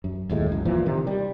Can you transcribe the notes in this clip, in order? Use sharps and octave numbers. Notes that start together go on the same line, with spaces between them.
F#2
D#1 D#2 A2 G#3
C#2 F#2
A#2 E3 F3
C3 D#3
G3